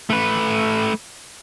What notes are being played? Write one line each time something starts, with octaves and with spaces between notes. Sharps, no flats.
A3 B4